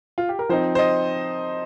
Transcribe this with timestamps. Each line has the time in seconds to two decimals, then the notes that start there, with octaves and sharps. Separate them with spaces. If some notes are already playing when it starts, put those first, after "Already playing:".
0.18 F4
0.29 G4
0.39 A#4
0.49 F3 C4 D#4 C5
0.75 C5
0.79 D#5